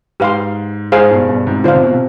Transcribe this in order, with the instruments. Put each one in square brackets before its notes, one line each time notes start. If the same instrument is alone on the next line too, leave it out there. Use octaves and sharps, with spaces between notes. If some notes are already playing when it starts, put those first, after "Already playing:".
[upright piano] G#2 [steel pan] G4 B4 F5 C6
[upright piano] G#2 [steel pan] G#4 C5 F5
[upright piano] G2 B2
G2 B2
G#2 C3
[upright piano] D3 [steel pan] F4 C5 F5
[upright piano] C3
B2
C3